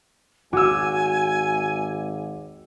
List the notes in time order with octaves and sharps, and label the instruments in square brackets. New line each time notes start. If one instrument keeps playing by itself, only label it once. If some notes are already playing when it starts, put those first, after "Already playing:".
[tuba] G#1 [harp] F#4 [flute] G#5 [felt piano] D6 E6